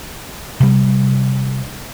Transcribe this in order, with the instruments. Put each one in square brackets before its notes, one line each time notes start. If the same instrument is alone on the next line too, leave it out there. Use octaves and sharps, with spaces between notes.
[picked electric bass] C3 G3